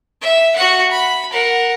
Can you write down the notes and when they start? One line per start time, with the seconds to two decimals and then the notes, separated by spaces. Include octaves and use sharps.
0.22 E5
0.56 F#4 F#5
0.91 B5
1.32 A#4 F#5